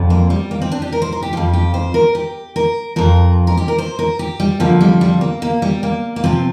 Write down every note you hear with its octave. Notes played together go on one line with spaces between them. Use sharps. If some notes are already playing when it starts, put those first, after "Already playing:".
Already playing: F2 D3 F3
A#3
G3
A#3
C4
D4
G4
A#4
C5
A#4
G4
F2 F3 G4
G4
C5
A#4
G4
A#4
F2 F3 A#4
A#4
G4
A#4
C5
A#4
G4
G3
F2 D3 F3 A#3
G3
G3
A#3
A#3
G3
A#3
A#3
C3 F3 C4